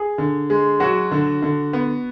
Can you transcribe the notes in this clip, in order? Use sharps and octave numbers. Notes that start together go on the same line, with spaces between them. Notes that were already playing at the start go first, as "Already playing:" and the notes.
Already playing: G#4
D3
G#3
F#3 F#4
D3
D3
B3